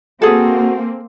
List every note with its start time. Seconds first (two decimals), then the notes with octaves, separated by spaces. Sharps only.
0.22 A#3 C4 F#4 G#4 A4